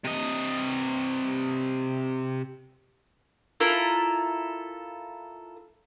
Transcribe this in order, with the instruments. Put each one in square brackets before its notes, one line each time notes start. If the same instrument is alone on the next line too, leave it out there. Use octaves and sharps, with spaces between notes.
[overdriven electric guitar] C3 D#5
[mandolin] E4 F4 A4 A#4